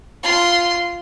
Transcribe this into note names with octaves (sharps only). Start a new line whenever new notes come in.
F4 C6